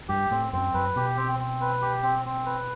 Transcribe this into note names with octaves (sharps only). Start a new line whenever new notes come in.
G2 G4
A2 C4
F#2 C4
F#2 B4
B2 G4
C4
C4
B4
G4
C4
C4
B4